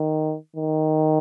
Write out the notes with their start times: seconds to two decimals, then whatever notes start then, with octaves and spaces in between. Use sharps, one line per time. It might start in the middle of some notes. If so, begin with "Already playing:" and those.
Already playing: D#3
0.56 D#3